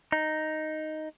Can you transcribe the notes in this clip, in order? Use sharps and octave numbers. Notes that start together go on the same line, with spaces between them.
D#4